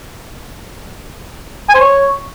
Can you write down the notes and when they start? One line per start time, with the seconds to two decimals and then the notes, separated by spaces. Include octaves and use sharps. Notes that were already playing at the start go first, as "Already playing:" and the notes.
1.69 G#5
1.75 C5
1.80 C#5